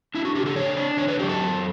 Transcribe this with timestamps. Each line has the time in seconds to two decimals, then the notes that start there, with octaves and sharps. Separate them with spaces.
0.15 D4 E4
0.25 F#4
0.35 C#3 G4
0.46 A4
0.56 D4 C#5
0.77 D4
0.97 D3 C#5
1.08 B4
1.19 F#3 G4
1.29 A4
1.39 F#2